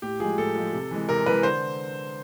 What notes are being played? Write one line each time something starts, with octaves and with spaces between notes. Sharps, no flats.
A2 G4
F3 G#3 G#4
A2 A4
F3 G#3
C3
E3 G#3
C3 A#4
E3 G#3 B4
D3 C5